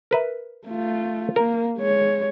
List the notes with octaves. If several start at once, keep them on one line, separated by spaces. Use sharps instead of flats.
A#4 B4 E5
A3 F4
A#3 A#4
G#3 C#5